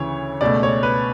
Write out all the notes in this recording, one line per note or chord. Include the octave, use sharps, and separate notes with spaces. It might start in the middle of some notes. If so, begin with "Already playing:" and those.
Already playing: D2 C#3 E3 C#5
C#2 B2 A3 D5
C#5
B4